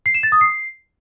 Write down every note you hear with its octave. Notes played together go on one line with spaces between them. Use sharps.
C7
E7
A6
D#6
C7